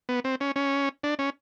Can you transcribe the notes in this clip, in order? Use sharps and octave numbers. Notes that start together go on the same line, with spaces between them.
B3
C4
C#4
C#4
D4
C#4